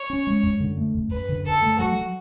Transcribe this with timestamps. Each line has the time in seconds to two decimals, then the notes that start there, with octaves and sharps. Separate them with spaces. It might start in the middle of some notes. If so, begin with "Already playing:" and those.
Already playing: C#5
0.10 C#4
0.27 G#3
0.43 F#2
0.60 D3
0.77 A3
0.94 F#2
1.11 F#2 B4
1.29 D3
1.46 F#2 A4
1.62 A3
1.79 F#3 F#4
1.96 F#3